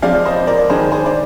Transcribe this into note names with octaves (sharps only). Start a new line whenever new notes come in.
F3 G#3 C4 D5 F5
C5 D#5
A#4 D5
D#3 G#3 D4 G#4 C5
G#4 C5
D5